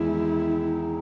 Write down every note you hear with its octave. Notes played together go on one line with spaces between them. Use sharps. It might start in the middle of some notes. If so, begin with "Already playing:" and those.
Already playing: E2 D#3 G#3 D#4 E4